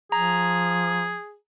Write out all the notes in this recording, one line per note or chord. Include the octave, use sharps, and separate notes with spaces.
F3 G#4 A#5